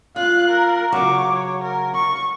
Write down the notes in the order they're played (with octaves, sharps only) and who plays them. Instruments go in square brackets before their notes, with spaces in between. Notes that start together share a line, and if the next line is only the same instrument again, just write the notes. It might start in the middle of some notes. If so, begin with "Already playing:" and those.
[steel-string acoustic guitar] F4 [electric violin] F5 F#6
[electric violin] A#4
[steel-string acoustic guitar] C#3 F#3 [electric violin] C#6 D6
[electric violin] C#5
A#4
C#6